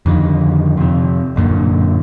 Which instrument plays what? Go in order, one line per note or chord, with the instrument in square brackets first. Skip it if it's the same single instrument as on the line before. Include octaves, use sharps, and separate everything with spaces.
[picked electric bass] F2 D3 D#3
F2 C3
A1 F#2 A#2 D3